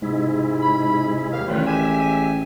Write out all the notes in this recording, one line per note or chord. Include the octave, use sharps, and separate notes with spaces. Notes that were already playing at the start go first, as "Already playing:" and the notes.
G#2 C3 G#3 E4
B5
D#2 F5
A1 F#2 A#2 D#3 C4 F4 B4
G#3 G4 E5 G#5